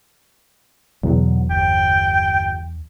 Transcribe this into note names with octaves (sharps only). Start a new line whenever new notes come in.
E2 B2 D3 F#3
G1 G5